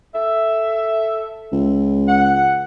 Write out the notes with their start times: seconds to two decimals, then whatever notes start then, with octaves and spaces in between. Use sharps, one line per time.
0.14 A4 E5
1.52 C#2
2.07 F#5